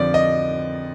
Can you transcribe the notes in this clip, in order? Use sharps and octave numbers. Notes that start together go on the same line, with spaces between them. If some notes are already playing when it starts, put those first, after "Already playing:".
Already playing: F2 D3 F3 D5
D#5